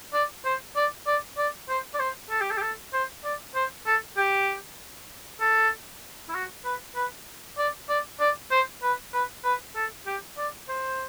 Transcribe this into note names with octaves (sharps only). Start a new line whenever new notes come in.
D5
C5
D5
D5
D5
C5
D5
C5
A4
G4
A4
G4
A4
C5
D5
C5
A4
G4
A4
E4
F#4
B4
B4
D5
D5
D5
C5
B4
B4
B4
A4
G4
D5
C5